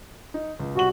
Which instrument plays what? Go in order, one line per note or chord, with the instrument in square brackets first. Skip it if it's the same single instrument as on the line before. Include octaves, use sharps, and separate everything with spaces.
[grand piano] D#4
C#2
[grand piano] C2 F#7 [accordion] F#4